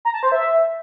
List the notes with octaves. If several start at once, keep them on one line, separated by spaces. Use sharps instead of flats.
A#5
A5
C5
E5